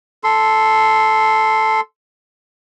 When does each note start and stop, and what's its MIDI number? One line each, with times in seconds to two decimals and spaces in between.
0.24 1.80 69
0.24 1.80 84